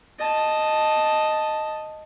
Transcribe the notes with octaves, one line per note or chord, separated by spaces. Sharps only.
D#5 A5